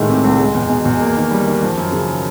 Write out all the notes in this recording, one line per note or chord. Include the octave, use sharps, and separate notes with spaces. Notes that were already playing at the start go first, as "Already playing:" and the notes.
Already playing: A2 D#3 G#3
C3
C#2
G#3
E2
B2
E2
A#3
D#3
G3
D#3
F3
F#2
C#3